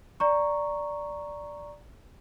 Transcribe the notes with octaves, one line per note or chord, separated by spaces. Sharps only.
D5 A#5 C#6